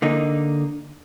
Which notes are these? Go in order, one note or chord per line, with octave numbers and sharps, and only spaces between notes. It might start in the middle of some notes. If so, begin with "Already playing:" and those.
D3 A#3 D#4